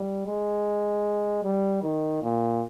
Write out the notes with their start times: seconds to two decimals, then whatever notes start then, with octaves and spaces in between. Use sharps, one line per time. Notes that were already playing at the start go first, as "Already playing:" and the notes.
Already playing: G3
0.26 G#3
1.44 G3
1.83 D#3
2.22 A#2